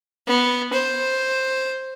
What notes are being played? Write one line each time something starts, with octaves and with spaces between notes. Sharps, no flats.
B3
C5